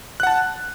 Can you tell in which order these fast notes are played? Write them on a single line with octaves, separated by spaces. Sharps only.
F#6 F#5 A5